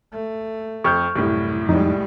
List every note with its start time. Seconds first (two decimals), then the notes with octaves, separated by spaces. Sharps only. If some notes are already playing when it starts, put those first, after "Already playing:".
0.12 A3
0.84 F2 C#6 F6 G6
1.16 C2 F#2 A2 E4
1.69 F2 G3 G#3 D#4